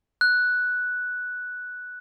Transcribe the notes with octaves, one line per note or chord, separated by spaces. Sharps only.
F#6